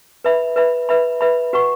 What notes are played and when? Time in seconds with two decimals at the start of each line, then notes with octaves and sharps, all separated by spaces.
0.24 B4 E5 B5
0.56 B4 E5 B5
0.89 B4 E5 B5
1.21 B4 E5 B5
1.53 F#4 B4 F#5 C#6